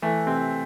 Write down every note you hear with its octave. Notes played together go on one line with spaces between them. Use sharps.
E3 A3
C3 C4